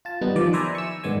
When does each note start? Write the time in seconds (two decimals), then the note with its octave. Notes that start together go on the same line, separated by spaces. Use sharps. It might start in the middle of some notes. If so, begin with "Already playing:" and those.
0.05 F4 A5
0.21 G3 B3 D#4
0.36 D#3 F3 D5
0.53 B4 C5 D5 E5 G#5 A#5
0.75 C#6 E6
1.04 G#2 D#3 B3 D5 G#5